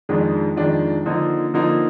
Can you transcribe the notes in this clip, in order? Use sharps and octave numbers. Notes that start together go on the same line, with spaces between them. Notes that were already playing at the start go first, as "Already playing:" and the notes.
F2 D#3 G#3 D4 F4
F2 D#3 G#3 D4 F4
D3 F3 A#3 D#4
D3 F3 A#3 D#4